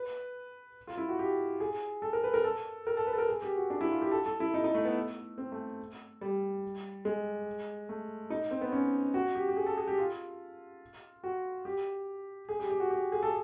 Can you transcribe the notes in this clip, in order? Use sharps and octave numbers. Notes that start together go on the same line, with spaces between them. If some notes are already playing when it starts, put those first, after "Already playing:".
Already playing: B4
F4
E4
F#4
G4
G#4
A4
A#4
B4
A#4
A4
A#4
A4
B4
A4
A#4
G#4
G4
F#4
D4
E4
F4
G4
A4
A4
E4
D#4
D#4
A3
B3
C4
A3
G3
G#3
A3
D#4
C4
B3
C#4
F#4
G4
G4
G#4
A4
G#4
G4
F4
F#4
G4
G#4
G4
G4
F#4
G4
G#4
A4